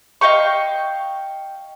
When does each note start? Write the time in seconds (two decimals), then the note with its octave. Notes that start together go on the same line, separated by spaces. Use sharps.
0.21 D#5 F5 G5 C#6